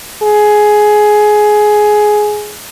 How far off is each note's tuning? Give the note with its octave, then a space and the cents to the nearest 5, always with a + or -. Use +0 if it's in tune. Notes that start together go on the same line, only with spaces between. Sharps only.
G#4 +15